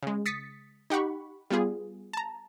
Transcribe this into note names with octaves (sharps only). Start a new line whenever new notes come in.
C#3 G#3
D#6 A6 B6 C#7
D#4 G4 F#5 B5 C#6
G3 B3 F4 G#4
A5 A#5